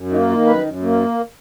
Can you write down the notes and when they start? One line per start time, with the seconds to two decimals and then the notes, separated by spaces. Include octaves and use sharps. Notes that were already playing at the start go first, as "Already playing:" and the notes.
Already playing: F#2
0.12 A#3 D#4
0.29 D#3 F4
0.46 F#2 B4
0.64 F#2
0.82 A#3